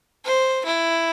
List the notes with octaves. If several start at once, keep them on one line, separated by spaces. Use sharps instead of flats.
C5
E4